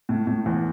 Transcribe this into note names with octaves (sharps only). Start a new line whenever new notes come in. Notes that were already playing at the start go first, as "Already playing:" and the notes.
A2
A2
E2